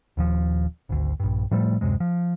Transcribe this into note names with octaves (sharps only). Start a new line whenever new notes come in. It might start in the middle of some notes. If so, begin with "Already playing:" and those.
D#1 D#2 F3
G#1 D2
A#1 G2
A2 F3 G3 A3
D1 F#2 C3 G#3
F3